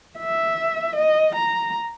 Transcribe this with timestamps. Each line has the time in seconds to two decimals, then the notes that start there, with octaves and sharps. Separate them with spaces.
0.18 E5
0.96 D#5
1.35 A#5